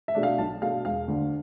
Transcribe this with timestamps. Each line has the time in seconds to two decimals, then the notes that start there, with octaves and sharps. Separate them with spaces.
0.08 E5
0.15 B2 A3 D4
0.23 F5
0.38 B1 A5
0.62 B2 A3 D4 F5
0.85 E1 F5
1.08 D2 D3